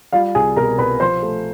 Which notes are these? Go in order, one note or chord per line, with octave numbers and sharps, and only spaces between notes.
G3 F4 F5
C2 G#4 G#5
B2 A#4 A#5
C2 B4 B5
F3 C5 C6
A3